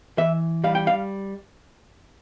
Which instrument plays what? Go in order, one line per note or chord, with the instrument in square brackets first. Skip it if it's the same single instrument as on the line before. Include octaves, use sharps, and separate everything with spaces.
[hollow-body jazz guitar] E3 E5
G3 F5
G5
F5